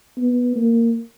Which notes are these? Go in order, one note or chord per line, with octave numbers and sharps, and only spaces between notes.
B3
A#3